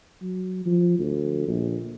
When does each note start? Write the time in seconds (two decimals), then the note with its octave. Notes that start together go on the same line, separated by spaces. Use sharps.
0.21 F#3
0.66 F3
0.99 D2
1.48 A#1